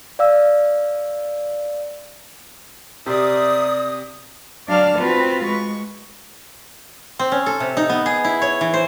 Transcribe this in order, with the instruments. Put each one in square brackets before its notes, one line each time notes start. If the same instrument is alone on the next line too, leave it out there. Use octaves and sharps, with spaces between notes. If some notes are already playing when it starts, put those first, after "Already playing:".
[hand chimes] D5 F5 E6
[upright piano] C3 [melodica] A#4 C5 E5 [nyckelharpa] D5 [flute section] D#6
[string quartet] F#3 D4 D5 F5 A5 F6
C4 F4 F#4 B4
G#3 C#6
[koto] C4
C#4
A4
C3
D#4
B3
G#4
E4
C#5
E3
C5